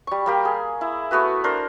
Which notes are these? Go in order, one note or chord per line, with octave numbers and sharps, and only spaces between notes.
G3 C#6
G3 A#3 G4
G#4
E4
A3 B3 F#4 B4
D4 A#4 C5